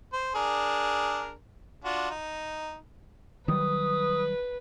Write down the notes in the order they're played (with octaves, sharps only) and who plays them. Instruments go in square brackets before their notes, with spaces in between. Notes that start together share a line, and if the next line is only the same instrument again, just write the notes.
[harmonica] C5
D4 G#4 A#4
D4 F4 F#4
D#4
[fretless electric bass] D#3 F#3 G3 [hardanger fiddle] B4 [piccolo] D#6